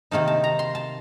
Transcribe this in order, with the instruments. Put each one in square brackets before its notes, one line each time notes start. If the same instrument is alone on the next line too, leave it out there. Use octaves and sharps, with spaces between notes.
[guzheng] C3 D#3 A#3 D#4 A5
A5
A#5
C6
A5